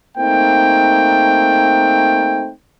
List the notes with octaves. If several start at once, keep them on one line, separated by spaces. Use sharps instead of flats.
A3 A#3 C4 D#4 G5